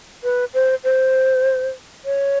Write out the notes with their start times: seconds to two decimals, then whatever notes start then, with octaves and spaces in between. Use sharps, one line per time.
0.24 B4
0.54 C5
0.84 C5
2.05 C#5